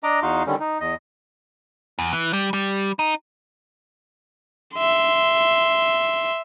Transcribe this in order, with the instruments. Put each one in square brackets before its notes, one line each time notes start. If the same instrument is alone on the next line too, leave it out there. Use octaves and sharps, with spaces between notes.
[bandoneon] D4 D#5 A#5 D6
E2 D#4 F#4 F5 C6
D3 D#3 G3 C#4
D#4
E2 D#5
[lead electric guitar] E2
E3
G3
G3
D#4
[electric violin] E5 C6